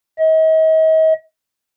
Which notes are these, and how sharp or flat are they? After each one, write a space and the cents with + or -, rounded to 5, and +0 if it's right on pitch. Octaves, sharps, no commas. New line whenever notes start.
D#5 +40